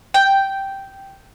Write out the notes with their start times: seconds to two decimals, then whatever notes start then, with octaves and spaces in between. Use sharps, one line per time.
0.14 G5